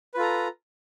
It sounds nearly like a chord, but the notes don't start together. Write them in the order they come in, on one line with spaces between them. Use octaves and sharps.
B4 F4 A4 A#5